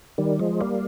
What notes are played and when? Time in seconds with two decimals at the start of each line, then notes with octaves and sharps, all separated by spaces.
0.18 D#3 G3
0.39 F3 G#3
0.61 G3 A#3